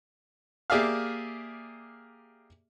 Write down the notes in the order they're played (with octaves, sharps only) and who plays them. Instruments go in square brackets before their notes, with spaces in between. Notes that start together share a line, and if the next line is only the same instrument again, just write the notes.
[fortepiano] A#3 G4 G#4 D5 E5 F5